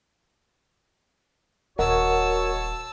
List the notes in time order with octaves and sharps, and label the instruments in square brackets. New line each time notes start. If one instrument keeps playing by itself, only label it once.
[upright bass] D#1 [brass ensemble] F#4 C#5 [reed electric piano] A#4 D#5 F#5 [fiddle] A5 E6